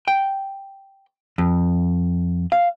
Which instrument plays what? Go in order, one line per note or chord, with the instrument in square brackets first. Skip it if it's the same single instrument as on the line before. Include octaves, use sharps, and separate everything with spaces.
[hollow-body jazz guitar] G5
F2
F5